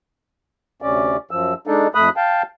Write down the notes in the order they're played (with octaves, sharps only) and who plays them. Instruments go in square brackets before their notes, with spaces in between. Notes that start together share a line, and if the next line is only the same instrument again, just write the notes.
[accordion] D2 C3 C#4 D5
F#2 F3 E6
G#3 D4 D#4 A4
F2 A3 B5 D#6 F#6
F5 G5 A5